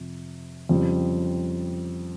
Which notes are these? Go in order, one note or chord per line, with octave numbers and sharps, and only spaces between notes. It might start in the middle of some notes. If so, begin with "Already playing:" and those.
Already playing: F2 C3
F2 C#3 G3